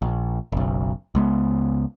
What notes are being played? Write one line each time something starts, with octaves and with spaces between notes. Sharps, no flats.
A#1
F#1 B1
C#2 G#3 B3